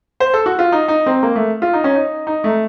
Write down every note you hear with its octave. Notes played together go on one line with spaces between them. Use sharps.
C5
A4
F#4
F4
D#4
D#4
C4
A#3
A3
F4
D#4
C#4
D#4
D#4
A3